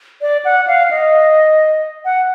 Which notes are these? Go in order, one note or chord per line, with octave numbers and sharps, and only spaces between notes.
D5
F#5
F5
D#5
F#5